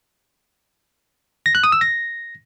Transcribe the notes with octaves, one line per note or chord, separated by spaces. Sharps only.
A#6
F#6
D#6
E6
A#6